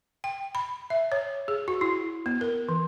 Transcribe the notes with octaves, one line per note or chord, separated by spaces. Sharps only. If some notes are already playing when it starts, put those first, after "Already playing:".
G5
B5
E5
C#5
G#4
F#4
E4
B3
A#4
E3